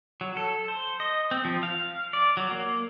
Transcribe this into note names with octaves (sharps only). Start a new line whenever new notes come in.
F#3
A4
C5
D#5
C4
F3
F5
D5
F#3
A#3